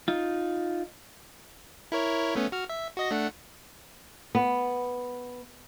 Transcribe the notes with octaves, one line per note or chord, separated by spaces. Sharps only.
D#4 F4
E4 A#4 C#5
A3 B3 C#4
F#4 F6
E5
F#4 D#5 A#6
A3 D4 F#5
B3